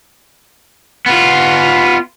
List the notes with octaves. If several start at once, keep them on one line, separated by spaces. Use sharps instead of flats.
B3 F4